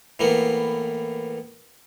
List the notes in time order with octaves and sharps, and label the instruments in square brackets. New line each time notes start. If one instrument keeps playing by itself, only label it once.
[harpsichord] A2 E3 A#3 B3